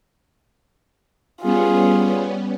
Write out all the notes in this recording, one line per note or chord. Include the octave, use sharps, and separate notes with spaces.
G3 B3 C#4 F4 G#4